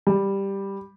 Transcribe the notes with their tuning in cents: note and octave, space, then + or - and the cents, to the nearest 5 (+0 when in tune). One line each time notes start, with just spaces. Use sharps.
G3 +5